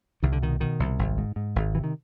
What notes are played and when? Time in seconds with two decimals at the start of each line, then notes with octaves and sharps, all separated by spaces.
0.23 C2 D#3
0.32 D3
0.43 B2 D#3
0.60 B2 D#3
0.80 C2
0.99 G#1
1.18 G#2
1.36 G#2
1.56 G#1
1.75 C3 E3
1.84 D#3